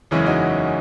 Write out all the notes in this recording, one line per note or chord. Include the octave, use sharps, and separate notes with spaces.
F#1 E2 C#3 E3 G#3 C#4 E4
D#4 F#4